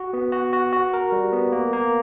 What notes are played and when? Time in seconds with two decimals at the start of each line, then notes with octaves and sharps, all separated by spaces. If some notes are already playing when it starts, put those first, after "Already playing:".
Already playing: F#4
0.13 B3
0.32 F#4
0.53 F#4
0.73 F#4
0.93 A#4
1.12 G3
1.32 B3
1.52 A#3
1.73 A#3